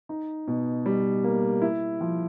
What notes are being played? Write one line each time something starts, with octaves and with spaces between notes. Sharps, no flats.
D#4
B2
G3
A#3
E4
F3